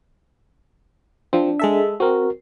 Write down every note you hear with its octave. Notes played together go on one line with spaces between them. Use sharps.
F3 C4 D4
G#3 A4 E5
C4 F#4 A#4